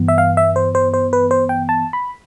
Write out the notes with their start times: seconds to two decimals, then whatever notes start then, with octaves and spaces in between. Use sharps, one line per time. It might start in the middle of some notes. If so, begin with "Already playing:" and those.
Already playing: G2 E3 B3
0.08 E5
0.18 F5
0.37 E5
0.56 C5
0.75 C5
0.94 C5
1.13 B4
1.31 C5
1.49 G5
1.69 A5
1.93 B5